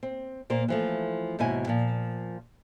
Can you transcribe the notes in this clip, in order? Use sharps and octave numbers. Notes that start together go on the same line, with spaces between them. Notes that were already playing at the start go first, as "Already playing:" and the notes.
C4
A#2 A#3 C5
E3 F3 A3
D#2 G#2 B2 E4 G#5
A#2 F3